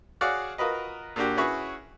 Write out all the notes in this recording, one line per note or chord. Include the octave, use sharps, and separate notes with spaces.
F#4 G#4 C#5 D5 F5 F#5
F4 F#4 A#4 B4 D#5
A#2 A#3 D4 F#4 G4
C#4 E4 F#4 G#4 B4 C#5